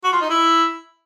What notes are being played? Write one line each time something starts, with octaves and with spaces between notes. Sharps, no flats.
F#4
F4
D#4
E4